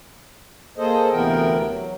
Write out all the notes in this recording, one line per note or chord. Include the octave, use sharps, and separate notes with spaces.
A#3 G#4 A4 C5 D#5
D2 C3 E3 B3 A#4 G5
F#3